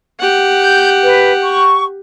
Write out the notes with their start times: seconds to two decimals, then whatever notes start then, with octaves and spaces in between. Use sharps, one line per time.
0.20 G4 F#5
0.61 G6
1.03 B4
1.43 C#6